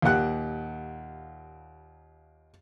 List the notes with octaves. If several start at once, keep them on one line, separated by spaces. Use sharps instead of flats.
D#2 A#2 G4 F#5 F#6